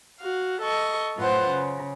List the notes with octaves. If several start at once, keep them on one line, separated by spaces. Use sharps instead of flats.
F#4 F5
A4 D#5 C#6
F#2 A2 F4 B4 C5 F#5
C#3